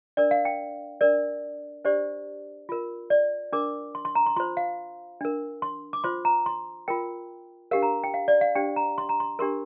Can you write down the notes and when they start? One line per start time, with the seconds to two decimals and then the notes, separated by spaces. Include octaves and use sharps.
0.17 D4 A#4 D5
0.31 F5
0.45 G5
1.01 D4 A#4 D5
1.85 D4 G4 C5 D5
2.69 F4 A#4
3.10 D5
3.53 D4 A#4 D6
3.95 C6
4.05 C6
4.15 A#5
4.26 C6
4.36 F4 C5 C6
4.57 F5
5.21 D4 A#4
5.62 C6
5.93 D6
6.04 F4 C5 C6
6.25 A#5
6.46 C6
6.88 F4 A#4 G5
7.71 D4 G4 A#4 F5
7.83 A#5
8.04 G5
8.14 F5
8.28 D5
8.41 F5
8.55 D4 G4 C5 G5
8.76 A#5
8.98 C6
9.09 A#5
9.20 C6
9.39 D4 G4 A#4 C6